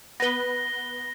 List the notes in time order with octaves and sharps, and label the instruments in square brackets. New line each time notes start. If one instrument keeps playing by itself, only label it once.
[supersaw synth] B3 B4 [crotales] A#6 G7